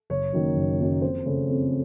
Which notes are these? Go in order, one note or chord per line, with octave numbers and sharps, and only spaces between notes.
F#1 C#5
F#2 D#3 A#3
F#1
F#2 D#3 A#3
F2 C5
C#3 A3
F2